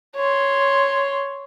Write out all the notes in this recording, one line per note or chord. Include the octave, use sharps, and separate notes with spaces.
C#5 C6